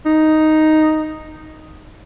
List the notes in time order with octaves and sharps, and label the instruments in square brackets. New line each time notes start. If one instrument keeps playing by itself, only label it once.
[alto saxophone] D#4